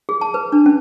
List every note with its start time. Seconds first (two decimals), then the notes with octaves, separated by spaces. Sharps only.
0.09 G#4
0.21 A5
0.34 B4
0.52 D4
0.66 C#4